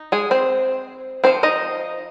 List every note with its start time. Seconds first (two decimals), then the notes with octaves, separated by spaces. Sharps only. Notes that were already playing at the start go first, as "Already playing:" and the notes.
Already playing: D#4
0.12 G#3 G#4
0.31 C4 C5
1.24 F3 C4 C5
1.43 D#4 D#5